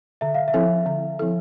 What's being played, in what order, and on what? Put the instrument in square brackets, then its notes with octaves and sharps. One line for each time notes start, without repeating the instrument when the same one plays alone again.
[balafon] D3 [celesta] E5
[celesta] F5
E5
[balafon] F3 C4 E4 A4
D3
F3 C4 E4 A4